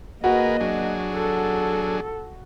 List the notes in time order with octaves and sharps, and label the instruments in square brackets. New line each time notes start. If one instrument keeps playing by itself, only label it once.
[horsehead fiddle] A#3 D#5 [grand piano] F#4 [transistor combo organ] G#4 A#4 B4
[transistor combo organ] F#3 D4 G#4
[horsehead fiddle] A4